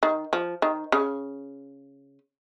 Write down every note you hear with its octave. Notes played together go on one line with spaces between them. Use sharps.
D#3
F3
D#3
C#3